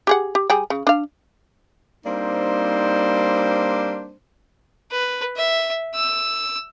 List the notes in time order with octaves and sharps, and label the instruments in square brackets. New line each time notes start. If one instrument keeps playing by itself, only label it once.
[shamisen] G4 G#4 F#5
G4
G3 G#4 G5
C#3
D4 F5
[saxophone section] G3 A#3 C4 D4 D#4 C5
[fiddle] B4
E5
E6